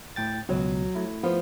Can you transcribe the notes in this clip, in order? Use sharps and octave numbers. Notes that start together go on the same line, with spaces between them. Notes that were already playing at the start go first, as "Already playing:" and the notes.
A2 G5 A6
C#2 B2 F#3
A3 E4
F3 B3